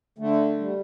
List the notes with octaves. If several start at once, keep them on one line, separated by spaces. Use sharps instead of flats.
D3 A3
G3